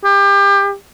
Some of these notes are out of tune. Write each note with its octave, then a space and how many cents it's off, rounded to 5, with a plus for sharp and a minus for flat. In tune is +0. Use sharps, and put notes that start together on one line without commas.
G4 +30